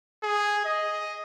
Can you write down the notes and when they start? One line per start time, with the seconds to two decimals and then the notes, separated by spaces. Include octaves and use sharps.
0.23 G#4
0.65 D#5